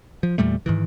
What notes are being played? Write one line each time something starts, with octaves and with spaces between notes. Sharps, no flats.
F3
E2 A#2 G3 A3
G#2 D#3 E3